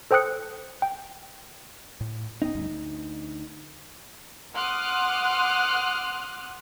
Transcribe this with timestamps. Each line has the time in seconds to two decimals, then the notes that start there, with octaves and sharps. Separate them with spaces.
0.11 A4 C5 G5 D#6 F#6 C#7
0.82 G5
2.01 A2
2.42 D1 B3 C#4 D#4
2.55 D#1 D2 G2
2.71 D2
4.56 F#5 C6 D6 D#6 F6 F#6